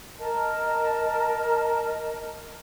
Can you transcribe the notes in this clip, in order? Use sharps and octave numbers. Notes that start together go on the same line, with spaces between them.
A#4 D#5 A5